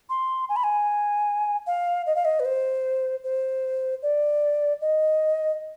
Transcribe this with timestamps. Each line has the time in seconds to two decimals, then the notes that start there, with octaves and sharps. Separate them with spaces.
0.10 C6
0.49 G#5
0.56 B5
0.64 G#5
1.67 F5
2.06 D#5
2.16 F5
2.25 D#5
2.40 B4
2.45 C5
3.24 C5
4.03 D5
4.81 D#5